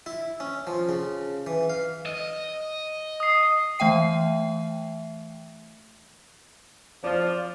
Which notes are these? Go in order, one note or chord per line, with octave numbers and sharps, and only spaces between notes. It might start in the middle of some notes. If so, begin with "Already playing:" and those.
E4
C#4
F3
C#3
E3
F5
D#5 D#7
D#6 C7
E3 A3 E5 G5 C7
F3 D5